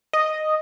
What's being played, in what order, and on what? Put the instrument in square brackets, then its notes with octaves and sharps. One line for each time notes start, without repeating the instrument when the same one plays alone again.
[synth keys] D#5